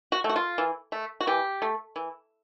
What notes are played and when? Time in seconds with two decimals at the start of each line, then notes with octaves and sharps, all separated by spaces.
0.12 F#4
0.24 A3
0.29 F#4
0.36 F4
0.58 E3
0.92 A3
1.20 F#4
1.27 E3 G4
1.62 A3
1.96 E3